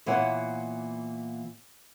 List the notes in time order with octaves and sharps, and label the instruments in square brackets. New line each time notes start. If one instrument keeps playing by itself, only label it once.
[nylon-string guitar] A#2 E3 B3 C#5 F#5